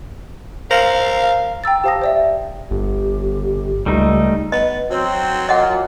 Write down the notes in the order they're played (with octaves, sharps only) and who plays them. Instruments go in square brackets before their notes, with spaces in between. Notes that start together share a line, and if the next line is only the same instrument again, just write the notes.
[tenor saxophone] A#4 [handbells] C5 [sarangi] F5
[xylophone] G5 A#5 E6 A6
G4 C5 F5 A5 D#6 A#6
C5 D5 E5
[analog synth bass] G1 [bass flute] G4
[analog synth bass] C#2 [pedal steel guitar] G3 A3 D#4
[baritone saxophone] B3 [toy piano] D#5
[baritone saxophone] F#3 [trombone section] C4
[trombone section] A#2 [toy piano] D#5 F#5